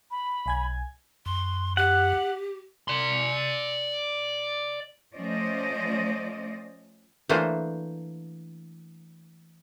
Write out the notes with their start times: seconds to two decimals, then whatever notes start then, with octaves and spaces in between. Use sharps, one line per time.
0.11 B5
0.46 B1 G#5 G#6
1.26 F#2 C6
1.77 G4 F#5
2.88 D5 C6
5.13 F3 A3 C#4 C5 D5 D#5
7.29 E3 A3 A#3 D4 C5